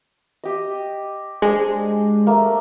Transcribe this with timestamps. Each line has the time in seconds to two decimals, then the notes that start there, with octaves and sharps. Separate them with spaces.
0.44 G4 D#5
1.42 G#3 D4 C5
2.27 A3 A#3